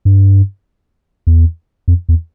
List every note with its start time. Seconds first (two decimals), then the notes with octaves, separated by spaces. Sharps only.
0.05 G2
1.27 E2
1.88 F2
2.09 E2